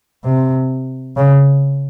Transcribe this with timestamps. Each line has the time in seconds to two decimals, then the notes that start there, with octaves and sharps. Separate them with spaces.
0.24 C3
1.16 C#3